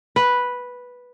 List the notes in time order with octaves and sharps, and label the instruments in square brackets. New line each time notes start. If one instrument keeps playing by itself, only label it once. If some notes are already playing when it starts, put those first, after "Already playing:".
[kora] B4